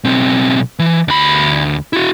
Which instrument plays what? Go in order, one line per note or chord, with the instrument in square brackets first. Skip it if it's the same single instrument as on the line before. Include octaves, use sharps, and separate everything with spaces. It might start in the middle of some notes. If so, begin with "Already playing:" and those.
[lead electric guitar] B1 C4
E3
D2 B5
E4 F#4